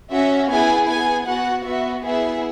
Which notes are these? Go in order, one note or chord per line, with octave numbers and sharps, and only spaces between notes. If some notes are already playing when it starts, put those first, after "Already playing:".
C#4 F#4 E5
B3 E4 G#4 G#5
B3 G#4 G#5
B3 F#4 F#5
B3 F#4 E5
B3 E4 G#4 E5